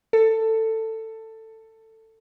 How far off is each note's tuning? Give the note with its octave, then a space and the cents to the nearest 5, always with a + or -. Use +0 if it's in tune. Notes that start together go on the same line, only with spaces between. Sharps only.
A4 +15